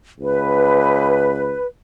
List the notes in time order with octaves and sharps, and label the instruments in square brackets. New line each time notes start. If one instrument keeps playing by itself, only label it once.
[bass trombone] C#2 [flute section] B4